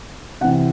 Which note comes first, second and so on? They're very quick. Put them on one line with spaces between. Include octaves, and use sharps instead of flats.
C3 F#5 E3